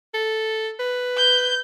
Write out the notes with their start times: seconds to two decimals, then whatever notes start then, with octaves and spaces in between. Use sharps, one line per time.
0.14 A4
0.80 B4
1.17 G6